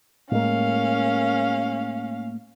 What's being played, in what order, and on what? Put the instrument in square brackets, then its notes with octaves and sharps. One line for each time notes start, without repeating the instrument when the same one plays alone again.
[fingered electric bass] A2 G#3 A#3 [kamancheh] C#4 F5